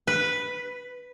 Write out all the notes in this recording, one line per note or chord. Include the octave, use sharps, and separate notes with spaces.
B4